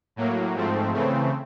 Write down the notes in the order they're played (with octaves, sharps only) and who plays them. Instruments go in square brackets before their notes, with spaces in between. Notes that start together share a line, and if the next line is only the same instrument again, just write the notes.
[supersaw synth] A2 F#3 A#3
G#2 F3 A3 C4
C#3 E3 A3 C4